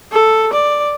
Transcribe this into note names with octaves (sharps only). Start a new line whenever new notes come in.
A4
D5